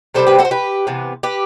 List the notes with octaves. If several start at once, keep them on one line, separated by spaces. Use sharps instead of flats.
C3 G3 C4 A4 C5
G4 B4
F#4 A4
C5
G4 B4
C3 E3 B3
G4 B4